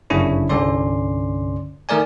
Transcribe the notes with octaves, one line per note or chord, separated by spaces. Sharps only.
G1 F#2 C#3 D4 E4 C#5
C2 G2 D3 C#4 D5 C6
D#3 A3 A#4 D5 G#5